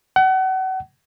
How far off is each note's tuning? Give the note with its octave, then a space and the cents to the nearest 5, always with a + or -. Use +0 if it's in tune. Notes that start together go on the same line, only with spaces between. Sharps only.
F#5 +35